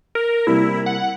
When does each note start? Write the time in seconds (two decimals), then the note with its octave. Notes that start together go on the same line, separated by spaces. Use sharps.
0.15 A#4
0.47 C3 G3 A#3 E4
0.86 F#5